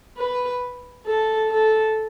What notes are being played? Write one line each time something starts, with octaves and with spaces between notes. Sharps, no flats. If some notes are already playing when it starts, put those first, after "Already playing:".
B4
A4
A4